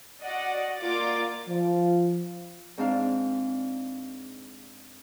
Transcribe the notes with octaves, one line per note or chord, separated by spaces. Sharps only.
F#4 D5 D#5 F#5
A#3 F4 D5 D6 A6
F3
G#2 C4 D4 F5